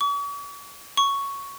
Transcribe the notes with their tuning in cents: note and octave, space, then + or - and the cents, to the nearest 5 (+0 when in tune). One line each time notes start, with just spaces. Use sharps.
C#6 +45
C#6 +5